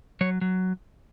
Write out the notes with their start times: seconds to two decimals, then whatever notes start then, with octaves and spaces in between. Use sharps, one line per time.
0.21 F#3 C#5
0.41 F#3